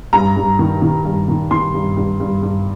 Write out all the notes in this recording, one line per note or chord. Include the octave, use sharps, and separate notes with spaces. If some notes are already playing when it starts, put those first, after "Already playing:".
G2 A#5
G2
D#3
D#3
G2
D#3
D#3 C6
G2
G2
G2
G2